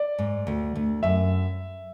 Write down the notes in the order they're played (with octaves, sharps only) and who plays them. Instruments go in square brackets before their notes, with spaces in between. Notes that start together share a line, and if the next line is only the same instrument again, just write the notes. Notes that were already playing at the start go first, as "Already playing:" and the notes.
Already playing: [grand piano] D5
[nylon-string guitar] G#2
D2
D2
[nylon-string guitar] F#2 [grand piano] E5